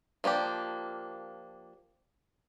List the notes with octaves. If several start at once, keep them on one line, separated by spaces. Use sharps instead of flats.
F3 A#3 D4 G4